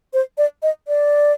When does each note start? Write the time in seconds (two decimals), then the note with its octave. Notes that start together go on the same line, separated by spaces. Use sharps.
0.13 C5
0.38 D5
0.63 D#5
0.88 D5